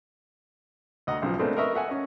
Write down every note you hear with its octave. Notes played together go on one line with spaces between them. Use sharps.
D2 D#5 F#5 A#5
B1 C#3 F3
G#3 A3 B3 C4 D4 A#4
A#4 B4 D#5 E5 C#6
A4 E5 F#5 G#5
C#4 D#5